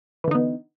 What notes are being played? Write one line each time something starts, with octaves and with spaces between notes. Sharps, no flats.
D3 E3 B3 D#4